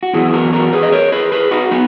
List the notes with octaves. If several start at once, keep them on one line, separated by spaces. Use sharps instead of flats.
F#4
F#2 E3 B3 E4 G#4
F#4 A#4
F#4 A#4
G#4 B4
D#5
A#4 C#5
G#4 B4
G#4 B4
D#4 F#4
B3 D#4